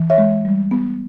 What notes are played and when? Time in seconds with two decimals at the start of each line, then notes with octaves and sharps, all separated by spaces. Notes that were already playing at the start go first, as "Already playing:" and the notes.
Already playing: E3
0.10 C#5 E5
0.18 G#3
0.45 G3
0.71 B3